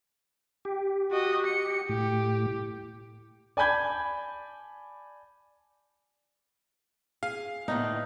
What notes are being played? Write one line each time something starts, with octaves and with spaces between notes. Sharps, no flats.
G4
F#4 D#5
C#7
A2 G4
D5 G#5 A5 B5 G6 G#6
G#4 F5
A2 D3 A#3 B3 D#4